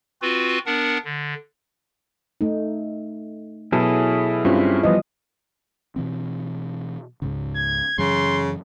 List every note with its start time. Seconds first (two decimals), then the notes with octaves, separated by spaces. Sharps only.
0.22 C4 F4 F#4 B4
0.66 B3 D4 A#4 F#5
1.05 D3
2.41 A3 D#4
3.72 B2 F#3 E4 G#4 A4
4.45 G2 C4 C#4 F4
4.83 E3 F3 G3 B3 D#5
5.96 B2 E3 C4
7.22 C#2 G#2 C#3
7.56 G#6
7.98 F#2 C#3 E3 F#3 C6